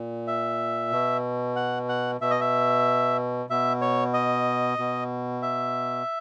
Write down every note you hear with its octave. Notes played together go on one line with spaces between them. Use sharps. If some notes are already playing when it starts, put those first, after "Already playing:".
Already playing: A#2
E5
B2
F#5
F#5
B2 E5
D#5
E5
B2 E5
C#5
D#5
B2
E5